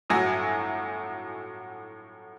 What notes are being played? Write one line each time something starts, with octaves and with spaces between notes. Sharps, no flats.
G1 A2 F#3 G#5 A#6